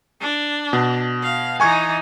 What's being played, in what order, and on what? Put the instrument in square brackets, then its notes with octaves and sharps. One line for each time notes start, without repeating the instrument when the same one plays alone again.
[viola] D4
[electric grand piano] B2
[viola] F5
[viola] E3 D#4 [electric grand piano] G#5 C#6 G#6